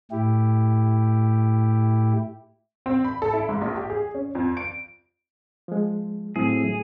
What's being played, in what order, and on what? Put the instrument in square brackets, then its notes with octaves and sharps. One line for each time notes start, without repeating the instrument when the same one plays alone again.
[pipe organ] A2 E4 G4
[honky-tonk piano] C4
B5
A4
E4
G#2
A#1
G4
G#4
C#4
F2
D7
[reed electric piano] F3 G#3
[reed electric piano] A2 [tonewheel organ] F#3 C4 E4 [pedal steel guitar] G#4